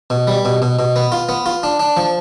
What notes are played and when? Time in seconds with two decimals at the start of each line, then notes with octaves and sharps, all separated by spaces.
0.10 B2
0.27 G3
0.45 B2
0.62 B2
0.79 B2
0.96 B3
1.12 F4
1.29 B3
1.46 F4
1.63 D4
1.79 D4
1.97 F3